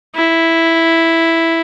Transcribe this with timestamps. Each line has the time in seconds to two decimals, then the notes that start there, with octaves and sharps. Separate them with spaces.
0.15 E4